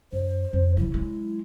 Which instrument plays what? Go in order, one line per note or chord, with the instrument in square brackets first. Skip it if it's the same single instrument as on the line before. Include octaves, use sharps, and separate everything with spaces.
[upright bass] F#2 [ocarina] C5
[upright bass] F2
[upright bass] C#3 F3 [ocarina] E4
[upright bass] F#3 G#3